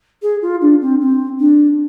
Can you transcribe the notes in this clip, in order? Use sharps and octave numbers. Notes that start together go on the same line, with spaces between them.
G#4
F4
D4
C4
C4
D4